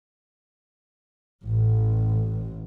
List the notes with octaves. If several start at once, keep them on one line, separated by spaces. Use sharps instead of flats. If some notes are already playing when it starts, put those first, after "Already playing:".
A1